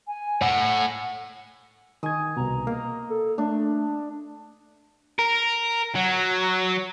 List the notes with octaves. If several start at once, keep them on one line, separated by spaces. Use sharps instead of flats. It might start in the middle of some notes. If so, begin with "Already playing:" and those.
G#5
A2 F#5
D#3 D#5 G#5 G#6
C2 B2 A#5
A#3 D#5
A4
A3 D4
A#4
F#3